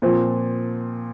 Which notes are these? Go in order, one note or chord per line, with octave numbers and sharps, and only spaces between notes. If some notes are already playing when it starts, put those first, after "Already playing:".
A#2 F3 C4